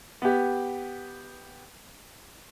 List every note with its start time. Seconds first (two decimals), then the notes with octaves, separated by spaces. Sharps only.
0.22 B3 G4